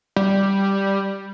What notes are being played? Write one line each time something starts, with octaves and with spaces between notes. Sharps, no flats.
G3